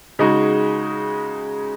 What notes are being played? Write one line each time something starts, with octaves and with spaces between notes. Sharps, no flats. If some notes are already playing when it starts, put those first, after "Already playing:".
C#3 G#3 D#4 F#4